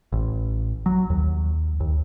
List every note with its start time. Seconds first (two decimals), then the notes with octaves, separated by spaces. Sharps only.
0.12 A1
0.86 F#3
1.10 D#2
1.80 D#2